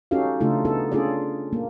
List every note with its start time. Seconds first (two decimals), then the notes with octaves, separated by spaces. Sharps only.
0.11 C#4 D#4 F#4 G4 A4 F5
0.40 C#3 A3 D4 D#4 F4 A4
0.65 B3 D#4 A4
0.92 C#4 D4 F4 G#4 A4 D5
1.53 A#3